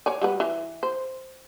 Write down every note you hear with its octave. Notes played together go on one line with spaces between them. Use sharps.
C#5 D5 G#5
G3 F#4 B4
E3
C5